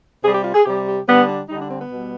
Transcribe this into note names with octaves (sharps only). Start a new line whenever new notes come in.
C3 G3 G#4
G4
F4
G#4
C3 G3 G4
G4
D3 G3 B3
D4
D3 G3 D#4
D4
C4
B3
B2 G3